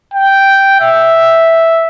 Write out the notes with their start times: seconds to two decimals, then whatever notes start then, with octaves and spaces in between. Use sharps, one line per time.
0.14 G5
0.81 E5